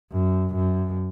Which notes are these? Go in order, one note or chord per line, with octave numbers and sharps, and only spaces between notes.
F#2
F#2